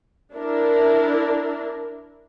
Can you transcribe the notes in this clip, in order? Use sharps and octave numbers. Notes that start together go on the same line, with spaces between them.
D4 E4 A#4